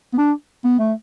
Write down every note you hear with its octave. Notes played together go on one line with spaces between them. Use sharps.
B3
D4
B3
A3